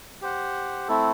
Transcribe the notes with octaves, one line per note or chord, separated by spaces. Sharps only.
G4 C5 F#5
A3 C4 E4 A4